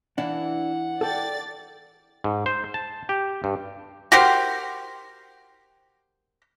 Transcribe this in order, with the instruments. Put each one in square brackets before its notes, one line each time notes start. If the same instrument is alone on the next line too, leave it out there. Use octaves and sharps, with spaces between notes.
[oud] E3 E4 F5 [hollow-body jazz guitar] D4 [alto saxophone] F#5
[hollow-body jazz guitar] A4 G5 [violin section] D5 A6
[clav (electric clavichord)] G#2
C5
A5
G4
G2
[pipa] F#4 G4 A#4 C5